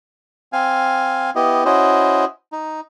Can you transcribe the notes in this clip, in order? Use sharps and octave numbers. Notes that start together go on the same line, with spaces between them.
C4 F5 G#5
B3 E4 G4 D#5
C#4 E4 F#4 C5 D#5
D#4